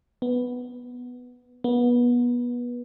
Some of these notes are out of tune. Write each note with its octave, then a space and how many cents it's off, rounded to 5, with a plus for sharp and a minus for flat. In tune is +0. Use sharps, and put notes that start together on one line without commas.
B3 +0
B3 -25